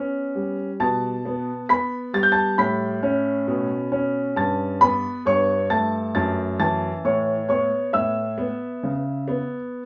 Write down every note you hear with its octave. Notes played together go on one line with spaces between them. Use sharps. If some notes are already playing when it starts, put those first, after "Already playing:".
Already playing: B3 C#4
G3
B2 A5 A6
B3
B3 B5 B6
G3 A6
G6
A5 A6
A2 B5 B6
C#4
B2
C#4
G2 A5 A6
B3 B4 B5
G2 C#5 C#6
A3 A5 A6
F#2 A5 A6
E3 A5 A6
A2 C#5 C#6
B3 C#5 C#6
A2 E5 E6
B3
C#3
B3